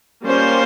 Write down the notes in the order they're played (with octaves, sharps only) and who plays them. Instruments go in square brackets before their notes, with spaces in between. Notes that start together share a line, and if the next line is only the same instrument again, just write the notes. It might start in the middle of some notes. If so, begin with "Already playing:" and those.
[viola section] G3 A#3 C#4 F4 C5